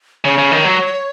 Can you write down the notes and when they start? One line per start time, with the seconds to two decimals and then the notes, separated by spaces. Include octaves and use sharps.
0.25 C#3 C#5
0.38 C#3
0.52 D#3
0.65 F#3